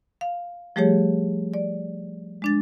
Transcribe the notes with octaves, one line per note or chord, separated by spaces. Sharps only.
F5
F3 G3 A3 G4 G#4 C#5
D5
G#3 D4 A6